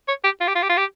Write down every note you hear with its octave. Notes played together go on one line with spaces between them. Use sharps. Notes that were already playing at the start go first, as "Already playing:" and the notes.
C#5
G4
F4
G4
F4
G4
F4
G4